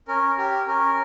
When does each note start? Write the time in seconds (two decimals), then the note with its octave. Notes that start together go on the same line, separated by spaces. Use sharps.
0.08 C#4 A#4
0.38 G4 A#4
0.67 C#4 A#4